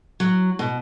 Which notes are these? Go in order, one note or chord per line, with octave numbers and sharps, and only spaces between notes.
F#3
B2